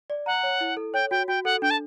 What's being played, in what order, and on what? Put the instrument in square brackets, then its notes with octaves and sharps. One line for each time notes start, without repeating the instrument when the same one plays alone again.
[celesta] D5
[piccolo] F#5 [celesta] A#5
[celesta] C#5
E4
A4
[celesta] C#5 [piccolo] G5
[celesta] F#4 [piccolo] G5
[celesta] F#4 [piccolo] G5
[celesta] A4 [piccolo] F#5
[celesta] D4 [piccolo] G5
[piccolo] A5